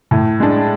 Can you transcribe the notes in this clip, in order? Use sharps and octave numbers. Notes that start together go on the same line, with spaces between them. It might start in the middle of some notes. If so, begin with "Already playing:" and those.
A2
G#3 D4